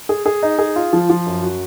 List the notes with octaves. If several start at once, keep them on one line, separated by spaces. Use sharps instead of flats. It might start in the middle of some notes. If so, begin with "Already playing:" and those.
G#4
G#4
D#4
G#4
F4
F3
F3
F#2
F#4